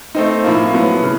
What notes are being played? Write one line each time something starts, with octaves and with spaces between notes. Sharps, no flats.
A3 C4 D#4
A2 F3 A#3
A2 F#3 B3
C#3